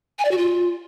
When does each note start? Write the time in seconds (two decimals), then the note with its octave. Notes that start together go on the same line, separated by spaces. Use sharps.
0.19 G#5
0.25 D5
0.31 F#4
0.38 F4